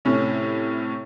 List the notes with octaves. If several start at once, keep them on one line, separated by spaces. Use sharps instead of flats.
A2 C3 C#4